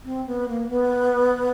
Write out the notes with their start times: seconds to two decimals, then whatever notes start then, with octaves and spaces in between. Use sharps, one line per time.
0.04 C4
0.26 B3
0.48 A#3
0.69 B3